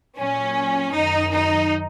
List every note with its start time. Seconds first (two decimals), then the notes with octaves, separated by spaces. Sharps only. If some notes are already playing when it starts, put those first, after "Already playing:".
0.18 A#2 F#3 C#4
0.94 F#2 D#3 F#3 D#4
1.32 D#4